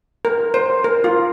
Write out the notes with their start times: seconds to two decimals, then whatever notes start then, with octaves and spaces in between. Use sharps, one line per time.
0.25 A#4
0.54 C5
0.84 A#4
1.04 F4